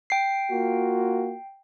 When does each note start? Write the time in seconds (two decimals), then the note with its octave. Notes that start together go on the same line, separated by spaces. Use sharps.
0.10 G5 C7
0.51 A#3 F4 F#4